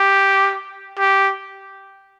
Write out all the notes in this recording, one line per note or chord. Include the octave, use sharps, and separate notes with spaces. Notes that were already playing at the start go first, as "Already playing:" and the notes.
Already playing: G4
G4